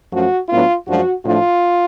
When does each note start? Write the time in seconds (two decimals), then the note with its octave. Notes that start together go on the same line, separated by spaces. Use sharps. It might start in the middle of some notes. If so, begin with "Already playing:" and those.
0.11 F#2 F3 A3 C#4 F#4
0.49 A2 F#3 B3 D4 F4
0.86 F#2 F3 G#3 D4 F#4
1.23 A2 F3 A3 D4 F4